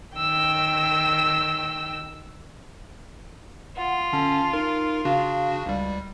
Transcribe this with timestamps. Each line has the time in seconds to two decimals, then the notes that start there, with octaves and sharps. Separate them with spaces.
0.16 D#3 G5 E6
3.77 F4 F#5
4.13 D3 C#4 A5
4.53 D#4 A#4
5.05 C#3 D4 F#4 F5
5.66 C#2 G3